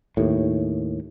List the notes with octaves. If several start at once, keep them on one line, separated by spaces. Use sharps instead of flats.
D#2 A2